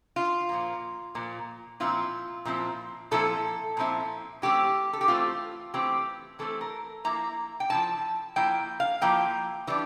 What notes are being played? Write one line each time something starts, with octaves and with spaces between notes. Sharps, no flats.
F4
A#2 F3 A#3
A#2 F3 A#3
A#2 F3 C4 E4 F4
A#2 F3 C4 E4
A#2 F3 C4 E4 A4
A#2 F3 C4 E4
E3 A3 C4 G4
A4
G4
E3 A3 C4 F4
E3 A3 C4 G4
E3 A3 C4 A4
A#4
F3 A#3 E4 A#5
G5
F3 A#3 E4 A5
F3 A#3 E4 G5
F5
F3 A#3 E4 G5
E3 G3 D4